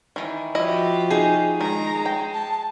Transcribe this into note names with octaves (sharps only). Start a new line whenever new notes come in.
D#3 E3
F3 E4 F#4 G4 D#5
D#4 G#4
D#3 G#3 A#5
G5
A5